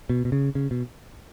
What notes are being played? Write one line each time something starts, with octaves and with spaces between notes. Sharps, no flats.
B2
B2
C#3
C#3
B2